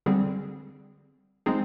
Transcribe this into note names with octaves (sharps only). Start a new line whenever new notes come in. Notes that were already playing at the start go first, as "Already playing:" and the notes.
D3 G3 C4 G#4
G#3 C4 D#4 G#4